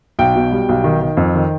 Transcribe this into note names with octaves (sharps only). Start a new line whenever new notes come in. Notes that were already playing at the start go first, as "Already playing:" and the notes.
B1 G5
B2
G3
B1
D#3
D#3
F2
D#3